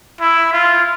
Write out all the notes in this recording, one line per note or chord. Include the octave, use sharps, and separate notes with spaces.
E4
F4